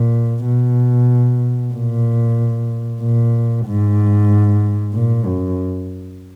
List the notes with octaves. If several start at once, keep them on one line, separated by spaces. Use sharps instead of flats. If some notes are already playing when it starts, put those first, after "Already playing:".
Already playing: A#2
B2
A#2
A#2
G#2
A#2
F#2